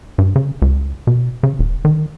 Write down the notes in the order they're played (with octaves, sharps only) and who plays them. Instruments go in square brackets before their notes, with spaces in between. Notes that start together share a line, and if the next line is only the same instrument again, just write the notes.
[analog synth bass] G2
C#3
C#2
B2
C#3
D#1
D#3